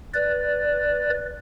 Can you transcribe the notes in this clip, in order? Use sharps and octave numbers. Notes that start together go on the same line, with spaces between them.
B4 D5